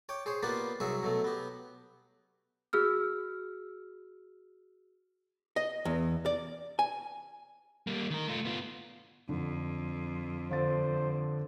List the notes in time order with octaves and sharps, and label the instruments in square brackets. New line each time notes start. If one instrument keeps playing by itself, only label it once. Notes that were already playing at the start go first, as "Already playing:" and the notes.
[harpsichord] C#5 G5 D6
G#4 C5 C#5
A#3 B3 F4 G4 B4 D5
C2 F#3 G#4 E5 C#6
B2 F#3 A3
B3 G4
[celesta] F#4 G#4 E6 F6
[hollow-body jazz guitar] D#5
E2
D5
G#5
[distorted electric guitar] G3 A#3
D#3 A#4
A3 F4
B3 F4
[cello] F2 [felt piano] D3
[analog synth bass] D3 [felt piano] F4 A6 [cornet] C5